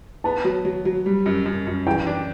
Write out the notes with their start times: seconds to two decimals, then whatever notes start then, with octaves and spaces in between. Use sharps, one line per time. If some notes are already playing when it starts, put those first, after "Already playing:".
0.24 B3 A5
0.44 F#3
0.65 F#3
0.85 F#3
1.06 G3
1.26 F#2
1.46 F#2
1.67 F#2
1.87 E3 G5
2.07 D4